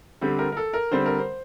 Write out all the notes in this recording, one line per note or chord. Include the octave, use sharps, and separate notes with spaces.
D3 G3 C4 G4
A#4
A#4
A4
A#4
D3 G3 C4 C5
A#4
C5